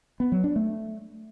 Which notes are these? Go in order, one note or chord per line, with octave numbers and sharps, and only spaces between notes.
B3
F#3
D4
A3